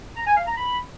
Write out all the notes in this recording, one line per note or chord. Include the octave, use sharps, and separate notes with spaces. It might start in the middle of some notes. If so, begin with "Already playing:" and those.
A#5
G#5
F5
A#5
B5